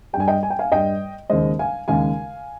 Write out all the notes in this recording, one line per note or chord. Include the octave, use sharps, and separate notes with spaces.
G2 G3 G5 G#5
D#5 G5
G#5
G5
F5 G#5
G2 G3 D#5 G5
D#2 C#3 G#3 C5 D#5
F5 G#5
D#2 C#3 G#3 F5 G#5